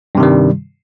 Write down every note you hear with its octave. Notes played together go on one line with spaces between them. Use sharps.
G2 C3 D#3 G3